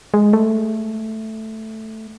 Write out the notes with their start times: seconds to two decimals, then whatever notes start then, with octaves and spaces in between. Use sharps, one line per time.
0.14 G#3
0.33 A3